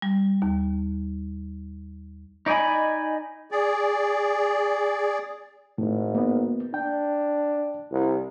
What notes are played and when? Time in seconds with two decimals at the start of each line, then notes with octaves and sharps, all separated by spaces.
0.02 G3
0.42 D#2
2.46 D#4 D5 D#5 G#5 B5
3.51 G#4 D5
5.78 G#1 A2
6.15 A#3 B3
6.74 D4 G5
7.91 C2